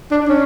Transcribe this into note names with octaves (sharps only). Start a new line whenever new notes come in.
D4
C#4